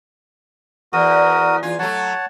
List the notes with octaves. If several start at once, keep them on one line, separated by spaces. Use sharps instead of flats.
E2 F#4 A#4 D#6
E2 F4 G#5
F#3 A3 C#5 F#5 A5